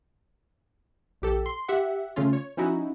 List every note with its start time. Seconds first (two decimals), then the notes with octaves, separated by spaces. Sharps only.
1.22 A#1 G4 A4
1.46 C6
1.68 G4 E5 F#5
2.16 C#3 A3 C#4 F4
2.33 C#5
2.57 F3 C#4 D#4 E4 F#4